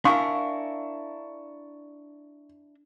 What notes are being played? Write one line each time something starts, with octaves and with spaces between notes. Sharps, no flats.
D4 E4 A#4 F5 G#5 C#6